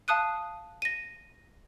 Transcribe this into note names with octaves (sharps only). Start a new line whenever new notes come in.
F5 A5 D#6 F#6 D#7
A#6 D#7